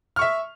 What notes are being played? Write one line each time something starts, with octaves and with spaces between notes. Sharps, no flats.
E5 C#6 F6